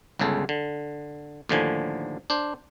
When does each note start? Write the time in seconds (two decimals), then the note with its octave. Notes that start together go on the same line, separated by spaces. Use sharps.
0.19 G1 C#2 C#3 G#4 A4
0.49 D3
1.49 D#2 A2 D3 F3 G#5
2.30 D4 C5